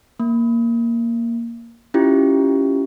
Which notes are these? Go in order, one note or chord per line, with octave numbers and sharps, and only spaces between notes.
A#3
C#4 E4 F4 G4